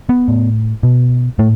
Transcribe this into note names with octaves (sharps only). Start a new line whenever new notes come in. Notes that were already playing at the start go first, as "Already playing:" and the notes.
B3
A2
B2
A2 A3